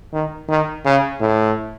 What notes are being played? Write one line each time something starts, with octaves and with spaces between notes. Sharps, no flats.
D#3
D#3
C#3
A2